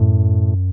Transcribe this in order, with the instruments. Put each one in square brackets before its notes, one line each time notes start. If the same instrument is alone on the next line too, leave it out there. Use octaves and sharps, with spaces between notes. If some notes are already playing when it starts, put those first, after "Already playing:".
Already playing: [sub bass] F#2 [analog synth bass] A2